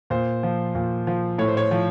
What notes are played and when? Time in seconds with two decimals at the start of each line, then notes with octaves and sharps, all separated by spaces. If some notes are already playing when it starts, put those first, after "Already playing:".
0.10 A#2 C5
0.43 F3
0.75 A#2
1.07 F3
1.38 A2 C#5
1.48 C5
1.57 C#5
1.71 F3